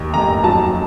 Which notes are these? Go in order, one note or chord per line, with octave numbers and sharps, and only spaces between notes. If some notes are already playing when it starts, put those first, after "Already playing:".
Already playing: D#2
F1 A#5
F#3 A5